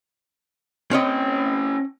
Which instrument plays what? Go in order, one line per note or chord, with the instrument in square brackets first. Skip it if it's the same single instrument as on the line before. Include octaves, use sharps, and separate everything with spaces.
[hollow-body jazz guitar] C4 C#5 D#5 [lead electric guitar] C#4 G5